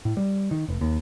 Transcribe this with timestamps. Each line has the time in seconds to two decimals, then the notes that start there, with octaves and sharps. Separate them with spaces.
0.05 A2
0.17 G3
0.51 D#3
0.68 F1
0.81 D#2